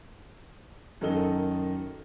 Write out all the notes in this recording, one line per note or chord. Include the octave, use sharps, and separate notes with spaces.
F#2 D#3 A4 D#5 G7